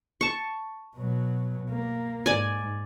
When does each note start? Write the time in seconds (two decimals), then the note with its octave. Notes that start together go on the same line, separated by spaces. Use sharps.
0.21 A5 C#6
0.96 B2 F#3
1.70 A#3
2.26 G#2 D5 G#5